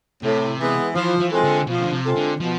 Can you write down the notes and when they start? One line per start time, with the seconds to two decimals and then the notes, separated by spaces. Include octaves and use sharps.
0.23 A2 C3
0.58 E3 G#3 B3
0.95 E3 F3
1.20 E3
1.30 G#3 C4 F4 A4
1.44 D3
1.67 B2 F3
1.79 D3
1.92 C3
2.04 G#3 C4 F4 A4
2.16 D3
2.40 B2 F3